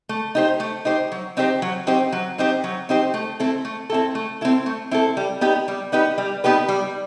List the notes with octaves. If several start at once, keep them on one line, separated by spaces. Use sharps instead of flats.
A3
D#4 G4 C5
A3
D#4 G4 C5
F#3
C4 D#4 G4 C5
F#3
C4 D#4 G4 C5
F#3
C4 D#4 G4 C5
F#3
C4 D#4 G4 C5
A3
C4 E4 A4
A3
C4 E4 A4
A3
C4 E4 A4
A3
C4 E4 A4
G3
B3 D#4 G4 B4
G3
B3 D#4 G4 B4
G3
B3 D#4 G4 B4
G3